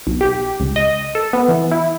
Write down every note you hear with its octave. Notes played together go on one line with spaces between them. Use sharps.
B1
G4
C#2
D#5
A4
B3
E3
E4